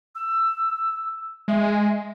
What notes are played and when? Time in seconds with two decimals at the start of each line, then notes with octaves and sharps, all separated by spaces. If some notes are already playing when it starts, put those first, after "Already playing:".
0.15 E6
1.48 G#3 E5